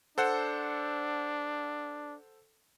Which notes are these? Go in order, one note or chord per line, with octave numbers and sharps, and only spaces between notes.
D4 A4 C5 F#5